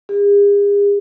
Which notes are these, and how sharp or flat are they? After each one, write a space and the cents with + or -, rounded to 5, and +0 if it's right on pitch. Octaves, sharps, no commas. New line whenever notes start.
G#4 -45